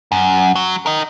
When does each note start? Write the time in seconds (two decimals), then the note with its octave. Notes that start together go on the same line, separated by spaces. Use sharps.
0.12 F#2
0.55 F#3
0.86 A#4 D#5